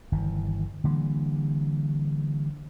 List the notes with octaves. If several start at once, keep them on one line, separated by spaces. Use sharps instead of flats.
G1 D#3 E3
D3 E3 G3 A#3